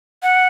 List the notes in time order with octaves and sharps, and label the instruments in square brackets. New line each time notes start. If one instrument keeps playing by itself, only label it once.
[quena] F#5